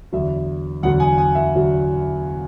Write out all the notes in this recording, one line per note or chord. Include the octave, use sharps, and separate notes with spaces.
E2 D3 F#3 E5
E2 D3 F#3 F#5
G#5
G#5
E5
D3 F#3